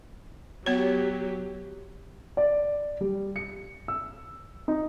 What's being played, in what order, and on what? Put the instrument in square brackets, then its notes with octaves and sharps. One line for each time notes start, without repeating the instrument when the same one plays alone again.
[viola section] F#3 G4 [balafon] B3 C#5
[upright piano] D5
G3
C#7
E6
D#4